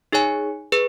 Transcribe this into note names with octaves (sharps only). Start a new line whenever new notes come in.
D#4 G#4 C#5 G#5
G#4 B4